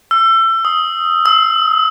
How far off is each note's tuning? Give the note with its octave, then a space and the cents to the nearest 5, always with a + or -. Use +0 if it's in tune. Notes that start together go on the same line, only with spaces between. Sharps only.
E6 +30
D#6 +15
E6 -40